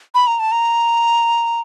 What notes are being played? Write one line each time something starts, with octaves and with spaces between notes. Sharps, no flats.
B5
A#5
A5
A#5